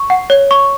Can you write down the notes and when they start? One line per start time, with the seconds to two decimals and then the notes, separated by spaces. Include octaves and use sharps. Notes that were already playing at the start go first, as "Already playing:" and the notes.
Already playing: C#6
0.10 F#5
0.30 C#5
0.51 C#6